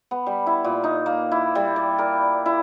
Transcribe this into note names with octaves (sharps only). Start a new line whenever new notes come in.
B3
G3
E4
A#2
D#4
A#3
E4
G3
D5
A#4
E4